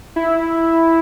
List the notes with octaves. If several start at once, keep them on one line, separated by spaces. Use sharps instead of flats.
E4